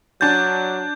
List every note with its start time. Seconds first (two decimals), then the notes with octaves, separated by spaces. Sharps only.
0.21 F#3 D4 G6 A6